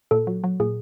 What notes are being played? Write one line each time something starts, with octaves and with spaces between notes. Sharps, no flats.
A#2 A4
F#3
F#3
A#2 G#4